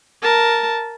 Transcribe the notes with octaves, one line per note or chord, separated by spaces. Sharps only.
A#4 A5